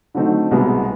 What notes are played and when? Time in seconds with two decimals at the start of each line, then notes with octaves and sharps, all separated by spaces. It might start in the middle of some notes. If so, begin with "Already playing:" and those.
0.15 D3 F#3 A3 C4 D#4
0.51 C2 B2 G#3 B3